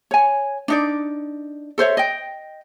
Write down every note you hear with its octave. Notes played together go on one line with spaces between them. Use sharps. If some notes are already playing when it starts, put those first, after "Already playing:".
C#5 G#5
D4 D#4 D5
A4 C5 C#5 E5
D#5 G5